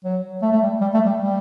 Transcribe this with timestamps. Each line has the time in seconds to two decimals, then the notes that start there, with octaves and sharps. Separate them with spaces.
0.04 F#3
0.42 A3
0.52 A3
0.62 G3
0.81 G3
0.94 A3
1.06 G3
1.19 G3